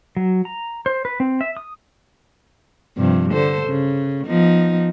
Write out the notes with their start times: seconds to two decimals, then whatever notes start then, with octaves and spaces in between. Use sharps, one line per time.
0.17 F#3
0.45 A#5
0.86 C5
1.05 B4
1.20 C4
1.41 E5
1.57 D#6
2.97 G2 C3 F3
3.32 D3 A4 C5
3.67 C#3
4.27 F3 B3 D#4